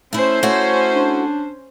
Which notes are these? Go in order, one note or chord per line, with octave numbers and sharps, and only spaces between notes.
A3 C#4 E4 C5
A3 E4 F#4 C#5
D4